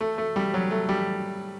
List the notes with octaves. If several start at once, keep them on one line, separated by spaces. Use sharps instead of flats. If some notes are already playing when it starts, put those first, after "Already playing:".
A3
A3
G3
F#3
A3
G3